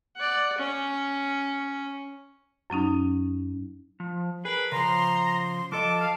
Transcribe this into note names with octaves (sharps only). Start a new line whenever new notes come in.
D5 F#5
C#4
F#2 F#3 C#4 D#4
F3
G#4 A#4 B4
C#3 F3 A#5 C6
F3 A4 D#5 A5 D6
F5